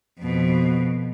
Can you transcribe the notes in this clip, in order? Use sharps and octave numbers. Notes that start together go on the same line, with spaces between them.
F2 B2